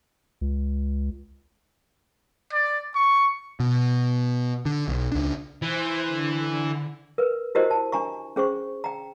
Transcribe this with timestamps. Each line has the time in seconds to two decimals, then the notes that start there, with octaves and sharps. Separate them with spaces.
0.41 C#2
2.53 D5
2.95 C#6
3.60 B2
4.66 D3
4.88 B1
5.12 C#2 D4
5.62 E3 C5
6.06 D3
7.18 A#4 B4
7.55 E4 F#4 G4 A#4 C5 D#5
7.71 A5
7.92 D4 G#5 A#5 C#6
8.36 C#4 G#4 C5 C#6
8.84 G5 A#5